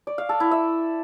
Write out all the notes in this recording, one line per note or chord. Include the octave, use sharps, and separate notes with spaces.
D5
F5
A4
E4
E5